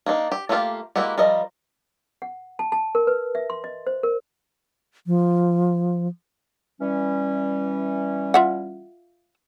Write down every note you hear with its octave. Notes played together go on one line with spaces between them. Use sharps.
A#3 D4 D#4
G4
A3 A#3 F4 G4 F5
G#3 A#3 E4 F#4 G4
F3 G3 A#4 D#5
F#5
A5
A5
A#4
B4
E5
C6
D#5
C5
A#4
F3
E3 G3 C#4
F4 E5 F#5